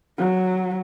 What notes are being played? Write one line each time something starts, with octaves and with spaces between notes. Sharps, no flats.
F#3